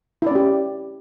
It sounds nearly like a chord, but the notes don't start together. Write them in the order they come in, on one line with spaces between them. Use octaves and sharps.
E4 D5 C#4 G4